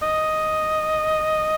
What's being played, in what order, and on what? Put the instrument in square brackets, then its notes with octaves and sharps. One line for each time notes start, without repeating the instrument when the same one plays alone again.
[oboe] D#5